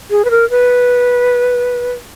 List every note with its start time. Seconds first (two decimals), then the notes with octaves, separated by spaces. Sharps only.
0.11 G#4
0.25 B4
0.31 A#4
0.50 B4